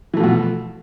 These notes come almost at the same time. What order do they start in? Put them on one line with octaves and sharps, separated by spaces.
E3 A3 F3 B2